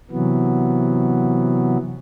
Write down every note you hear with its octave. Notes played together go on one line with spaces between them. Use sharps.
C3 E3 F#3 B3